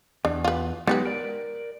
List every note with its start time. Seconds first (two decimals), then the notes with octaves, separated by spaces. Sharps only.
0.25 E2 D4
0.44 F4 B4
0.87 F#3 G#3 B3 D#4 G4 B4
1.05 A#4 D5